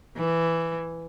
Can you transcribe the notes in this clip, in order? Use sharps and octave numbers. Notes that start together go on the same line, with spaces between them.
E3